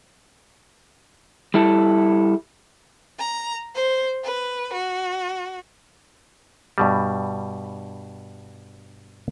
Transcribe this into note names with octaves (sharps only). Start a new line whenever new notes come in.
G3 E4 A4
A#5
C5
B4
F#4
G2 B2 G3